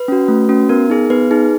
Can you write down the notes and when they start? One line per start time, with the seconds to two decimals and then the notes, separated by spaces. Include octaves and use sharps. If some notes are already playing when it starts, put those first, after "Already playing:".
Already playing: B4
0.08 C#4 F#4
0.28 A3
0.49 C#4 F#4
0.69 B3 A#4
0.90 D#4 G#4
1.10 B3 B4
1.31 D#4 G#4